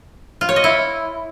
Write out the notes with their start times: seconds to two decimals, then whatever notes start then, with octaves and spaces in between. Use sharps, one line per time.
0.41 F4
0.49 C#5
0.56 D#5
0.64 E4